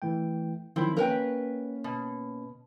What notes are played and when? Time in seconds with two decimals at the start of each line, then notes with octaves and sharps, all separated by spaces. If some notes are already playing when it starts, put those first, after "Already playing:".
0.02 E3 A3 G5
0.76 D#3 F3 F#3 C4 E4
0.97 A#3 C#4 A#4 B4 C#5 G5
1.84 B2